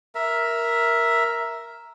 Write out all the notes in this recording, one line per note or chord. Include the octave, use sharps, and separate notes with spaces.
A#4 E5